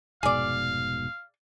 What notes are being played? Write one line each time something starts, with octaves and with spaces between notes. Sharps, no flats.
F1 G#2 B2 G#4 D5 F5